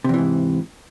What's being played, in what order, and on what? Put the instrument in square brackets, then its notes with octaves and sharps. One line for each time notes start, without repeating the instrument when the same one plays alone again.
[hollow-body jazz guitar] C3
E2
E3
G#2